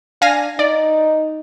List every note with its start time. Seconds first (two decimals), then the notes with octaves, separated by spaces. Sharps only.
0.22 D4 F5 G#5 A#6
0.59 D#4 D5